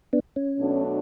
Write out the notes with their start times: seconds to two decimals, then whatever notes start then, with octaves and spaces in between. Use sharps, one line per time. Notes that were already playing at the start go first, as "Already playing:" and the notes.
0.13 B3 D4
0.36 C#4
0.58 B2 F#3 A3 D4